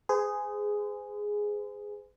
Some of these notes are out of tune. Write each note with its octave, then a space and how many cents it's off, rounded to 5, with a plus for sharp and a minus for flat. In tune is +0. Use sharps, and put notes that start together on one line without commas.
G#4 +0 C5 -40